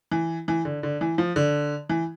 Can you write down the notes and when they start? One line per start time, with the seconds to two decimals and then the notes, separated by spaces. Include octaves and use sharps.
0.11 E3
0.48 E3
0.65 D3
0.83 D3
1.01 E3
1.18 F3
1.36 D3
1.90 E3